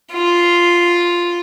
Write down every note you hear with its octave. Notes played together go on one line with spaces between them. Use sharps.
F4